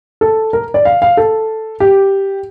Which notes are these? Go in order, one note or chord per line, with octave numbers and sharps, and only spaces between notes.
A4
A#4
D5
F5
F5
A4
G4